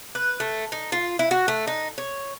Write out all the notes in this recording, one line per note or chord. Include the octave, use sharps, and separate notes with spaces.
B4
A3
D#4
F4
E4
F#4
A3
D#4
C#5